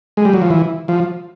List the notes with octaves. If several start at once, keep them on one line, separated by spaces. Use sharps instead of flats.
G#3
G3
F#3
F3
E3
F3